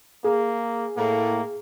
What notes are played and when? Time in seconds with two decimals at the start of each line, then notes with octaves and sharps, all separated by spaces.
0.24 A#3 G#4
0.97 A2 A#3